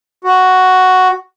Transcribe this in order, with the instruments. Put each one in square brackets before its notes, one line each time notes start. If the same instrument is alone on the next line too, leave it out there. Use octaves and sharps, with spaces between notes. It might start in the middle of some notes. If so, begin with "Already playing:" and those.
[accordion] F#4